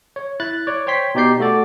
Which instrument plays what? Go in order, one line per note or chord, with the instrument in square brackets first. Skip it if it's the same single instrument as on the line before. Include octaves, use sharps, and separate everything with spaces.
[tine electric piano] C#5
E4 F#6 A6
C#5 D5
C5 C#5 G5 C6 B6
B2 D#4 G4 D5 G6 C7
A3 F#4 A4 D5